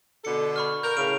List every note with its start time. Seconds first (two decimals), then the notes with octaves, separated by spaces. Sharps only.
0.25 B2 D3 A4 C#7
0.56 B5 C#6 F6
0.83 A#4 G6
0.97 A2 C#3 D7 F7